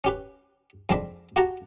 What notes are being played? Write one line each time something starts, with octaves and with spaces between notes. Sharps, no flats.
C#4 G4 B4
F2 G#3 C4 D4 B5
F#4 G4 F#5 A5 A#5